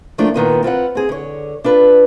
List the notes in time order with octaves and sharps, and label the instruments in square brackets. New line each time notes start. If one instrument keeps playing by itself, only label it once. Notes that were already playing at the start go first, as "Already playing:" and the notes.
[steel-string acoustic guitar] D#3 F3 A3 A#3 D4 F4
A#2 D#3 B3 F4
C4 F4 B4 F#5
C4 G#4
D3 C#5
D4 F4 B4